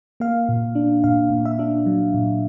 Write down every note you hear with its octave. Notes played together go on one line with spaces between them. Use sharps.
A#3 F5
A#2
D4
A#2 F5
A#2
E5
D4
F#3
A#2